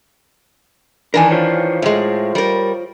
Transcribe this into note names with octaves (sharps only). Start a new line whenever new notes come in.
D#3 E3 D4 A#4 G#5
F4 C5 C#5
A2 G#3
G3 A#4